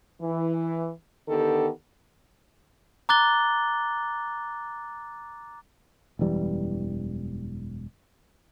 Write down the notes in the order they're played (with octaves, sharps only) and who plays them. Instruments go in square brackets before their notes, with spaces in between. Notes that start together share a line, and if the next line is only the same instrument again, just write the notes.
[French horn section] E3
D3 D#3 B3 G4 A4
[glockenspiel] A#5 D6 F#6 A6 G7
[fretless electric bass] E1 F#2 E3 G3